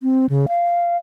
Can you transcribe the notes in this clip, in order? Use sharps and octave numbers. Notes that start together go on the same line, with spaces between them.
C4
C#3
F5